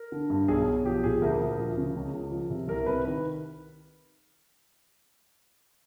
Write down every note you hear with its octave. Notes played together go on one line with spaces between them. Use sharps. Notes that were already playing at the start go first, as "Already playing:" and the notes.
Already playing: A#4
D3
G2
B1 G#4
B1
F3 G4
A#2 G#4
D2 A#4
D2
F3
C#3
C#2
C#2
F3
C3
C2 A#4
C2 B4
D#3 B4